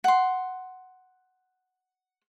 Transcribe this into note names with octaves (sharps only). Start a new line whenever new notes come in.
F#5 C6